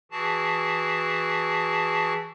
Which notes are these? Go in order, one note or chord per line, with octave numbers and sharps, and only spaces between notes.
E3 F#4 G#4 A5